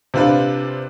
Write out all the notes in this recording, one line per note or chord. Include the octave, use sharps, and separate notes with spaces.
C3 C4 D4 F4 B4